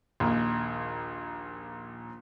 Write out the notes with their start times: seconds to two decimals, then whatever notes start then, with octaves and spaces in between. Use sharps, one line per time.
0.20 A#1 D#2